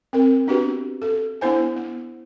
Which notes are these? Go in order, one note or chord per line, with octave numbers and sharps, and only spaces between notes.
C4 A#4
B3 D4 F#4 G4 B4
A4
B3 D4 E4 C5 G#5
B3